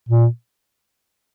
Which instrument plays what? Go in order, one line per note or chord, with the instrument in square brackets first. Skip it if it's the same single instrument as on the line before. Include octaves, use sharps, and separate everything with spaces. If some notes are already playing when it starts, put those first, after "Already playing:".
[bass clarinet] A#2